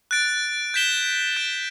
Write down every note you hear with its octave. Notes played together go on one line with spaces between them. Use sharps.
F#6 A6 D7
G6 B6 E7 G7
F#6 A6 D7